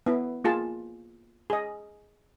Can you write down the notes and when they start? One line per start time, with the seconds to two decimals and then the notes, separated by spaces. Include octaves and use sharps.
0.06 B3 E4
0.44 A#3 F4 G#4 A5
1.50 G#4 D#5